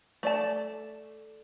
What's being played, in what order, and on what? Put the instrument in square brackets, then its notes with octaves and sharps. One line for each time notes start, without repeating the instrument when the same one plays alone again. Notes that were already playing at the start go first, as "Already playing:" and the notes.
[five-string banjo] A3 D5 A5